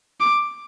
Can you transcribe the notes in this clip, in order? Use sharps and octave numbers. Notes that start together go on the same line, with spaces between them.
D6